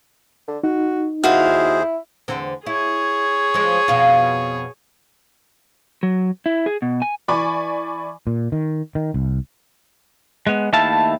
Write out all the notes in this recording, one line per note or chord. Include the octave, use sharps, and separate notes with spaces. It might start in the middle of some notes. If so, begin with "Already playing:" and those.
D3
D#4 F#4
D#2 E4 F#4 G#4 C5 D#5 F5
E2 D3 C4
E4 G#4 C#5
F3 G#3
F2 B2 F4
F#3
E4
G#4
B2
G#5
E3 D5 G#5 B5 C#6 D6
A#2
D#3
D#3
C2
G#3 B3
D#2 A3 E4 A4 F5 A5